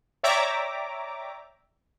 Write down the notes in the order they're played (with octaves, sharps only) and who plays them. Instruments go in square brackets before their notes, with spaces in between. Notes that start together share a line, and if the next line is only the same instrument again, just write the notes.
[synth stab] C#5 D5 E5 G5 A#5 D6